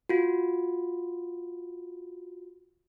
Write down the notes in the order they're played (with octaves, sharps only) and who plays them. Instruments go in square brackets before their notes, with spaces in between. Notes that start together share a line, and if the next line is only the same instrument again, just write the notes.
[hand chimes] F4 F#4